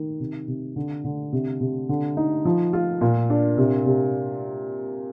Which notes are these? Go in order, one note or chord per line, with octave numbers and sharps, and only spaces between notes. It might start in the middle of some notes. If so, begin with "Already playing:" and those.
Already playing: D#3
C3
C3
D3
D3
C3
C3
D3
D#4
F3
F4
A#2
D4
C3
C3